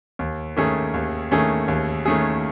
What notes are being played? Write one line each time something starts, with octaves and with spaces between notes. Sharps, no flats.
D#2
D#3 A3 C#4 G#4
D#2
D#3 A3 C#4 G#4
D#2
D#3 A3 C#4 G#4